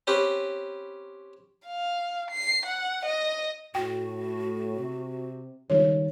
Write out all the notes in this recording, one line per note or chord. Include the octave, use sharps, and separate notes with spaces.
C4 C#4 G4 B4
F5
C7
F#5
D#5
A2 F#4 G5
C3
C#2 D#3 G3 C#5